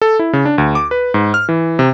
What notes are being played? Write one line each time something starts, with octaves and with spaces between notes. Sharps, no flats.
A4
E4
C#3
D4
D2
D6
B4
G#2
F6
E3
C3